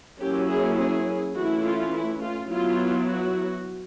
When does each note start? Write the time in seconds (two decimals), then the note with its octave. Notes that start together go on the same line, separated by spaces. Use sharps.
0.20 F#3 A#3 C#4 E4 G4
0.49 G#4
0.78 G#4
1.35 E3 A3 C#4 E4 F#4
1.64 F4
1.93 E4
2.22 F4
2.50 F#3 B3 E4 F4
3.07 F#4